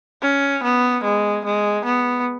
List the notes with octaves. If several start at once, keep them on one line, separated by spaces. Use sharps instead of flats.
C#4
B3
G#3
G#3
B3